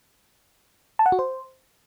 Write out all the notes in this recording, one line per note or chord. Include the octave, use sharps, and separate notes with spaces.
A5
F#5
F#4
C5